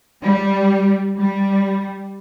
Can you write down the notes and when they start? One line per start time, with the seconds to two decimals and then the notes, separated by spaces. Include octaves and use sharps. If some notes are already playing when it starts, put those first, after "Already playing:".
0.22 G3
1.18 G3